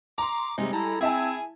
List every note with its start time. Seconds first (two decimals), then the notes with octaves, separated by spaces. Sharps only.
0.18 A#5 C6 D6
0.58 C3 G3 G#3 D#4
0.73 E4 A4 A#5
1.01 C4 E4 G#4 E5 G#5 A5